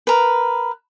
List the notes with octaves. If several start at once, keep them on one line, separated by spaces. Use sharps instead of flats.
A#4 B4